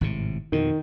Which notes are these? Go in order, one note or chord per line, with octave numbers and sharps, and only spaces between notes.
G#1 A2 C3
F2 B2 D#3